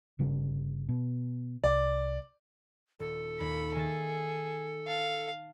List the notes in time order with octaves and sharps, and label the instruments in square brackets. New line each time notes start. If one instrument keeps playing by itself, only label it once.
[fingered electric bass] G1 C#3 G3
B2
[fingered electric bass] C2 [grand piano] D5
[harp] D#1 [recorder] A4
[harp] D#2 [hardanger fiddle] B5
[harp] D#3 E5 A6 [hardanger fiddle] G#4
[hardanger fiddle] F5 [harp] A5